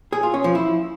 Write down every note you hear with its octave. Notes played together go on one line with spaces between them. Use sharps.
G#4
F4
C#4
F3
E4